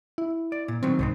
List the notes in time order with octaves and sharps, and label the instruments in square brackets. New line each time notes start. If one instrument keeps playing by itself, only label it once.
[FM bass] E4
[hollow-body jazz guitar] D5
A#2
[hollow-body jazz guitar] B2 D#3 F#3 [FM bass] C4
[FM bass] C2 [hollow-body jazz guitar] G#2 D#3 C4